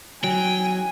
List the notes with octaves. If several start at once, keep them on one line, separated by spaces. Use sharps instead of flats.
F#3 G5 G#5